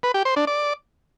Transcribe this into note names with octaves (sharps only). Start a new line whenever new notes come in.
B4
G4
C5
D4
D5